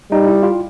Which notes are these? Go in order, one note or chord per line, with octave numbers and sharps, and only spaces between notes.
G3 D#4
E4
F4